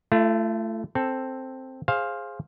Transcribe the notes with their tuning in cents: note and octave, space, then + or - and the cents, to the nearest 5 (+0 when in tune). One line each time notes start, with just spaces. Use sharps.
A3 +0 F4 -45
C4 +5 A4 +0
G#4 +0 C5 +20 F5 +0